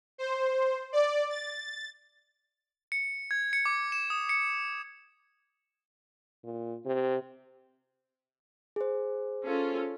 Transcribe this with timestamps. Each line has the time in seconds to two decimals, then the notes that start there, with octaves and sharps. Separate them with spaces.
0.18 C5
0.93 D5
1.29 A6
2.92 C#7
3.31 G#6
3.53 C#7
3.66 D6
3.92 E7
4.10 D#6
4.29 C#7
6.44 A#2
6.85 C3
8.76 G#4 C5
9.44 C#4 F4 A4